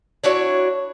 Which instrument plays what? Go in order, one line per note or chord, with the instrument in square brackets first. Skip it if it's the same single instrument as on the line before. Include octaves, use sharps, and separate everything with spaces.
[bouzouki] D4 E4 F#4 C#5